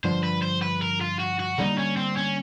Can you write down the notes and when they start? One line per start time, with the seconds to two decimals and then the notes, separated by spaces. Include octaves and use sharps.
0.04 G2 D3 F3 C5
0.23 B4
0.42 C5
0.62 B4
0.82 A#4
1.01 F4
1.20 F#4
1.40 F#4
1.58 D3 G3 A#3 D#4
1.78 C#4
1.97 C4
2.17 C#4